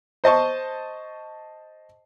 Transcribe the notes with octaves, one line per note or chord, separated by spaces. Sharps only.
C5 D#5 A5 C#6